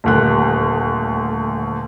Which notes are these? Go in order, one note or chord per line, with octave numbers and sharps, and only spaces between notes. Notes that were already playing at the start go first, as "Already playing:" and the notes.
D#1 D2 F#6